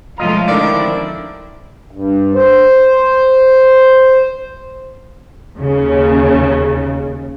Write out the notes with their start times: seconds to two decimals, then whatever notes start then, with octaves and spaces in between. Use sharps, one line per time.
0.18 B1 F3 G#3 A3 F4 D#5 A#5
0.48 D3 D#3 F3 C4 D4 E4 A#4 D5
1.91 G2
2.35 C5
5.57 D#2 C#3